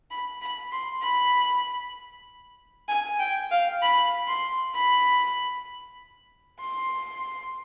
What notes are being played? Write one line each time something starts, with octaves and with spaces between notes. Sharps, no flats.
B5
B5
C6
B5
G#5
G5
F5
B5
C6
B5
C6